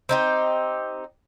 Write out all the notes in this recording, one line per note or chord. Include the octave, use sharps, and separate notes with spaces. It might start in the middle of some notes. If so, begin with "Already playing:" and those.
C4 D#4 G4